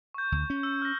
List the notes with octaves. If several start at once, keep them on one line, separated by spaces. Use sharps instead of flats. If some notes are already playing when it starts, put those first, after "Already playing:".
C#6 G6
D2
C#4
E6
F6 A#6